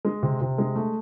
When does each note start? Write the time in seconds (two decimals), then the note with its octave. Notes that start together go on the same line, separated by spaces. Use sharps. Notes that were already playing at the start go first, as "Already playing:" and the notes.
0.05 G#3
0.23 C3
0.41 C3
0.58 G#3
0.75 A3